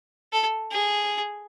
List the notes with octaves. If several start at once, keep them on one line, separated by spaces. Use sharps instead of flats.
A4
G#4